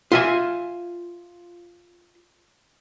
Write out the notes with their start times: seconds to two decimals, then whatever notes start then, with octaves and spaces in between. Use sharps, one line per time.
0.12 F4 E5 G#5